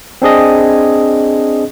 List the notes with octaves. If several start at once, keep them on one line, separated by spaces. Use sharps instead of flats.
C4 D4 G#4 D#5